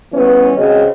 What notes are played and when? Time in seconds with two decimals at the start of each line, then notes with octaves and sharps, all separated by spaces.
0.12 E3 G3 B3 C#4
0.57 C#3 C4 F#4 D#5